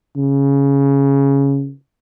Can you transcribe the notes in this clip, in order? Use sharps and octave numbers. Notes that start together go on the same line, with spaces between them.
C#3